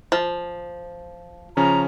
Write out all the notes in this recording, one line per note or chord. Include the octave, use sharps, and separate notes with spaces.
F3
C#3 F3 C#4 A#5